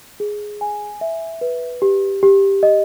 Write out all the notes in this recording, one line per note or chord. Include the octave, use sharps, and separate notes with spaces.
G#4
G#5
E5
B4
G4
G4
D#5